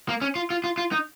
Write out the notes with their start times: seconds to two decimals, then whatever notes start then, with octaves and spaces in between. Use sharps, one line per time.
0.09 A#3
0.22 C#4
0.36 F4
0.50 F4
0.64 F4
0.78 F4
0.92 D#4